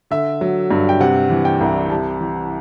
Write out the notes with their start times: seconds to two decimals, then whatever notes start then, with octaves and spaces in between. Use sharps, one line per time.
0.11 D3 E5
0.41 F#3
0.71 G2
0.89 G5
1.00 C3 F#5
1.30 E3
1.45 G5
1.61 C2
1.90 C3 A5
2.21 E3